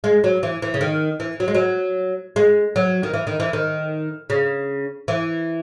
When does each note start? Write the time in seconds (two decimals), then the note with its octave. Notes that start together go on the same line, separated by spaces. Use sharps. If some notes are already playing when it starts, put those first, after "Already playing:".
0.04 G#3
0.24 F#3
0.43 E3
0.62 E3
0.74 C#3
0.81 D#3
1.20 E3
1.40 F#3
1.48 G#3
1.55 F#3
2.36 G#3
2.76 F#3
3.03 D#3
3.14 E3
3.27 D#3
3.40 E3
3.53 D#3
4.30 C#3
5.08 E3